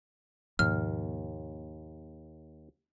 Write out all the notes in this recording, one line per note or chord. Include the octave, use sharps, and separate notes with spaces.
D#2 G#2 B2 F3 F6